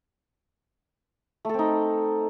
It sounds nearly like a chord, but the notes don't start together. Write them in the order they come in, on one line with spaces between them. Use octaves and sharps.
A3 A4 C4 D#4